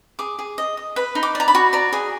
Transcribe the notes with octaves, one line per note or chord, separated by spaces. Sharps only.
G#4 D6
G#4
D#5
D#5
B4 B5
D#4
D6
D5 A#5
B5
F#4
D5 A#5
G#4